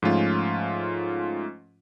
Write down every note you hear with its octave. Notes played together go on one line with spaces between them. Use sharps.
G#2 F3 A3 C#4 F4